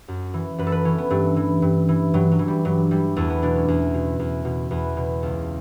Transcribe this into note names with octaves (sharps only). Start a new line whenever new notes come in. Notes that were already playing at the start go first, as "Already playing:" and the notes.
F#2
E3
F#2 B4
A4
B4
E3 C#4
B3
G2 A3
E3
G2
E3
G2 F#3
F#3
E3
G3
G2 F#3
E3 G3
E2 A3
B3
B2 D4
C#4
E2
B2
E2
B2
E2 B3
B2
C#2